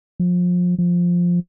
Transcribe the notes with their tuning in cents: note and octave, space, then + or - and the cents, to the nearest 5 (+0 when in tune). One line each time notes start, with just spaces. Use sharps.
F3 +30
F3 +5